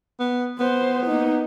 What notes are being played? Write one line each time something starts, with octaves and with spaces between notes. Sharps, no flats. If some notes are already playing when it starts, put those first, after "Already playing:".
B3
B3 C5
A#3 D#4